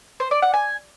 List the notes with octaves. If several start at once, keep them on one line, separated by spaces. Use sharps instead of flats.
C5
D5
F#5
G#5